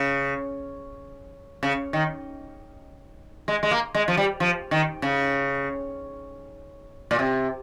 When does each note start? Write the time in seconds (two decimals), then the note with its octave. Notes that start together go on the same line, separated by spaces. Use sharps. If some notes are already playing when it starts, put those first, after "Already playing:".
Already playing: C#3
1.63 C#3
1.93 D#3
3.48 G#3
3.63 G#3
3.71 A#3
3.95 G#3
4.08 F3
4.17 G3
4.40 F3
4.71 D#3
5.02 C#3
7.11 A#2
7.19 C3